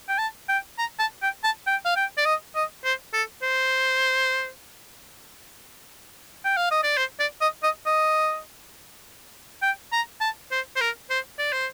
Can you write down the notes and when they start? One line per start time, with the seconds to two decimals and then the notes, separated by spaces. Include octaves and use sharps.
0.08 G5
0.18 A5
0.49 G5
0.78 A#5
0.99 A5
1.23 G5
1.44 A5
1.67 G5
1.85 F5
1.96 G5
2.17 D5
2.25 D#5
2.55 D#5
2.84 C5
3.13 A4
3.42 C5
6.45 G5
6.57 F5
6.71 D#5
6.83 D5
6.97 C5
7.20 D5
7.41 D#5
7.63 D#5
7.86 D#5
9.62 G5
9.92 A#5
10.21 A5
10.51 C5
10.76 C5
10.81 A#4
11.10 C5
11.39 D5
11.53 C5